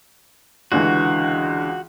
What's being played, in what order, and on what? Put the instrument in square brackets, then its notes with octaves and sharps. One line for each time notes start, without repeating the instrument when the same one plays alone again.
[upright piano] C#2 D3 E3 [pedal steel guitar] F#4